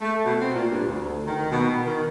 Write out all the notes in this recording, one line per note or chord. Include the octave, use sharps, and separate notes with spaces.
A3
B2
C4
A#2
G2
D2
D#3
B2
D#3